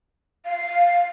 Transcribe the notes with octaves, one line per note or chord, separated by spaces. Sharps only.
F5